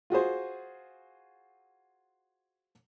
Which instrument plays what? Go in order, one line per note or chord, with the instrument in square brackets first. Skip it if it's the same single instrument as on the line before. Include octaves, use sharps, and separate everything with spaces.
[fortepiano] F4 F#4 G#4 C5